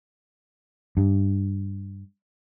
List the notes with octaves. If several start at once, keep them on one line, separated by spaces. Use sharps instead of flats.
G2